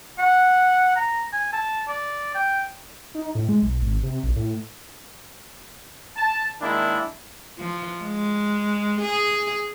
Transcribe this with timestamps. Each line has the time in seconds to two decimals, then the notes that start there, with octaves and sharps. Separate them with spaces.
0.19 F#5
0.96 A#5
1.33 G#5
1.53 A5
1.88 D5
2.35 G5
3.15 D#4
3.35 A2
3.49 G#3
3.63 B1
3.82 G#1
4.03 C3
4.24 A#1
4.36 A2
6.17 A5
6.62 D#3 G#3 A#3 D4 E4
7.58 F3
8.00 G#3
9.01 G#4